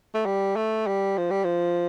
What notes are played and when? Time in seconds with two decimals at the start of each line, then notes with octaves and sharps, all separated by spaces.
0.14 A3
0.26 G3
0.56 A3
0.87 G3
1.17 F3
1.30 G3
1.44 F3